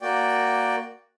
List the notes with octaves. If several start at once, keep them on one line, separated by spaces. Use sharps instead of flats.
A#3 F#4 D5 G5